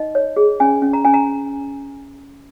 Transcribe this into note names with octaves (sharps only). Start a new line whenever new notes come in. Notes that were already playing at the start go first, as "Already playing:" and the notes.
Already playing: D#4 D#5
C#5
G#4
C#4 G#5
C#4
A#5
C#4 G#5
A#5